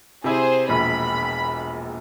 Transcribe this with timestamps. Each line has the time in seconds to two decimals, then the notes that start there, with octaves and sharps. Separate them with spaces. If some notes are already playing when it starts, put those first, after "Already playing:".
0.24 C3 E4 G#4 C5
0.69 E1 A#1 A#2 B5